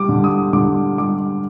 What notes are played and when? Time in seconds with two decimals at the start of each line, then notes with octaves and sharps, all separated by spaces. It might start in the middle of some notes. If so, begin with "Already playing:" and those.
Already playing: G3 D6
0.09 D3
0.24 D#6
0.53 D3 D6
0.98 G3 D6